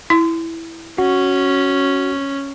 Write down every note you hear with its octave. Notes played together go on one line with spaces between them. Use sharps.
E4
C#4 F#4